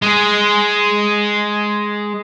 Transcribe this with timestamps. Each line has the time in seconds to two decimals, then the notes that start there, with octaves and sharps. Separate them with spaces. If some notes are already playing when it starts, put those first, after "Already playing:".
0.02 G#3 G#4